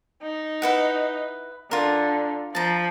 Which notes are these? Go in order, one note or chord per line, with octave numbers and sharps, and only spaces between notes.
D#4
E4 B4 F#5
D3 F4 A#4
F3 A5 A#5